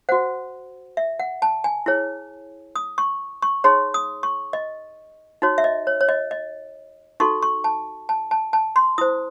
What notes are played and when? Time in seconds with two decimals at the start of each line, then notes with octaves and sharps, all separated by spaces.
0.09 F#4 C5 F#5
0.97 E5
1.20 F#5
1.42 A5
1.64 G#5
1.86 E4 G#4 C#5
2.76 D#6
2.98 C#6
3.42 C#6
3.64 D#4 G#4 C#5 C6
3.94 D#6
4.23 C#6
4.53 D#5
5.42 D#4 F#4 C#5
5.58 E5
5.64 D#5
5.87 C#5
6.01 C#5
6.09 D#5
6.31 D#5
7.20 D#4 F#4 A4 C#6
7.43 C#6
7.64 A5
8.09 A5
8.31 A5
8.53 A5
8.76 C6
8.98 E4 C5 D#6